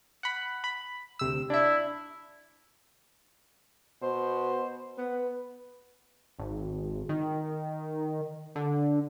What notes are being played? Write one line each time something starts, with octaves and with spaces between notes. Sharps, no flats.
F#5 B5
B5
D2 C3 E6
D4 E4 E5
B2 C5
B3 B4
G#1
D#3
D3